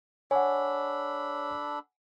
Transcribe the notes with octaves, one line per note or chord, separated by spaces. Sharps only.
D4 A4 C#5 F#5 G#5 B5